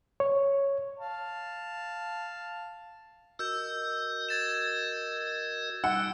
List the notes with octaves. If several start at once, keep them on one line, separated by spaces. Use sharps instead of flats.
C#5
F5 A5
F#4 A#4 D#5 E6 G6
G#6 A6 E7
G3 D#4 F#5 E6